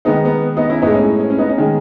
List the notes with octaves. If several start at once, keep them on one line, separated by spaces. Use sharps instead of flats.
D#3 G#3 B3 D#4
B3
B3 D#4
C#4 E4
A2 G#3 B3 D#4
C#4
C#4
C#4
B3 D#4
C#4
D#3 G#3